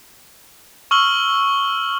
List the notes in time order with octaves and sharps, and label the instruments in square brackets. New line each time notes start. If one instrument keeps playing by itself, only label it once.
[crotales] C#6 E6 F6 F#7 G7